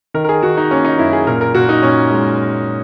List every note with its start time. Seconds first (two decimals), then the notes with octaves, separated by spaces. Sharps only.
0.14 D#3 A#4
0.24 A#4
0.29 G#4
0.43 D#3 F#4
0.57 D#4
0.71 A#3 C#4
0.85 D#4
0.98 F#2 E4
1.13 G#4
1.27 A#2 A#4
1.41 A#4
1.55 A#2 F#4
1.69 D#4
1.82 A#2 C#4
2.10 G#3